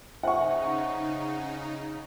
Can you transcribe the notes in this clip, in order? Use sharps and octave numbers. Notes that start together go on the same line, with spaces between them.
C#3 D#4 C5 E5 F#5 G#5 C#6